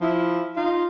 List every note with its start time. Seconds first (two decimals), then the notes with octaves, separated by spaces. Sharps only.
0.02 F3 E4
0.56 D#4 F4